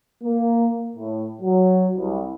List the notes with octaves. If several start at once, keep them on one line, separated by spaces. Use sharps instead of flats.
A#3
A2
F#3
C2